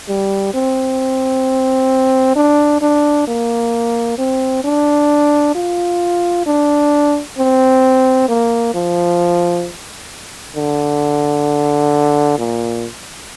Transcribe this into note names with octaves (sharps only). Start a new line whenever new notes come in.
G3
C4
D4
D4
A#3
C4
D4
F4
D4
C4
A#3
F3
D3
A#2